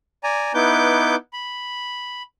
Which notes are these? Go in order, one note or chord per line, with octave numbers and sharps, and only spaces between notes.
D5 G#5 A#5
B3 D#4 E4 B4 D6 G6
B5